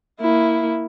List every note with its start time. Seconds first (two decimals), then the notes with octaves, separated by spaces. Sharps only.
0.21 A#3 E4